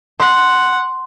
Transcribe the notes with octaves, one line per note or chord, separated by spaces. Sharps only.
F#5 C6